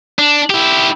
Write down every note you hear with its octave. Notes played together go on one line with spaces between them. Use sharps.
D4
E4 G4